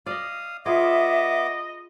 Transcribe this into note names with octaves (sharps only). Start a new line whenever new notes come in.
D5 D#5 F5 D#6
B3 F4 G#4 D#5 E5 D6